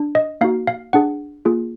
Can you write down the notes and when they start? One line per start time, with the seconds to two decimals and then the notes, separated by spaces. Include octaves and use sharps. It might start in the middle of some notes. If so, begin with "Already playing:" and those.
Already playing: D4
0.15 D#5
0.41 A#3 D#4 F#4 F5
0.67 F5
0.93 D4 G#4 F#5
1.45 A#3 F4 G#4